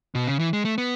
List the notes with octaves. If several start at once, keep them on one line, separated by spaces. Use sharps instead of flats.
B2
C#3
E3
G#3
A3
B3